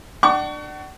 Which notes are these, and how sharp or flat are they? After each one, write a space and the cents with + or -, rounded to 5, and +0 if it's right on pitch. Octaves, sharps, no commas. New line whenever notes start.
D4 +25 F#5 +40 C#6 +25